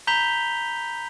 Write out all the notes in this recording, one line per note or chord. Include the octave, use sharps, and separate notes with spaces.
A#5 B5 G6 B6 F7 G7